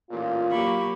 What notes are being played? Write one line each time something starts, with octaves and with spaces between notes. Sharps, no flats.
A1 A#2 F4
F#3 A#3 G4 B5 C#6